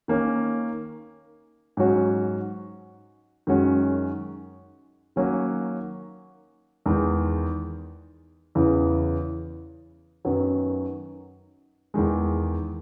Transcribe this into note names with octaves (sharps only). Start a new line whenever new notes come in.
D#3 A#3 C#4
G#2 F#3 C#4 F#4
F#2 D#3 G#3 C#4 F#4
D#3 F#3 A#3 C#4 F#4
E2 D#3 G#3 D#4
E2 C#3 E3
F#2 D#3 F#3 B3
E2 D#3 G#3